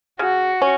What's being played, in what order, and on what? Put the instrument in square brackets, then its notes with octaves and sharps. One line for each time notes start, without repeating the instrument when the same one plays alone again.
[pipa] C#3 [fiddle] F#4
[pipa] C#4